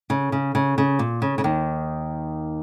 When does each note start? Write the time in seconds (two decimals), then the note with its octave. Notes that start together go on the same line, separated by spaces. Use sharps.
0.10 C#3
0.32 C#3
0.55 C#3
0.78 C#3
0.99 A#2
1.22 C#3
1.38 C#3
1.44 D#2 D#3